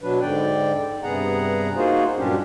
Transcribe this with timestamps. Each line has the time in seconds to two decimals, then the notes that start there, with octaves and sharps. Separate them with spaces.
0.01 B2 F#3 D4 B4
0.22 G#2 D3 D5 G5
1.03 G2 C3 B3 G#4 F#5 A#5
1.76 A#3 D#4 F4 F#4 G#4 C5
2.17 G2 A#2 F#3 C#4 D4 G4